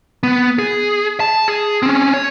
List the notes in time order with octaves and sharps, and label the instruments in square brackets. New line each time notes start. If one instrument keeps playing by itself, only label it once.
[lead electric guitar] B3
G#4
A5
G#4
C4 C#4
C#5